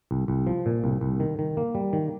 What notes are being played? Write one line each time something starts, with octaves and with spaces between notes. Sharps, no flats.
C2
C2
F3
A#2
C2
C2
D#3
D#3
A#3
G3
D#3